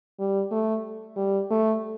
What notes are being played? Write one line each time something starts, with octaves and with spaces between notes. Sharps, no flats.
G3
A3
G3
A3